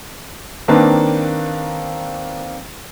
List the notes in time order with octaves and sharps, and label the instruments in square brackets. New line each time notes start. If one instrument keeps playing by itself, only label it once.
[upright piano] D#3 A#3 C4 D4 B4